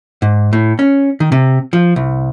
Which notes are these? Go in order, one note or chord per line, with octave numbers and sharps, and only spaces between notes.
G#2
A2
C#4
D#3
C3
F3
C2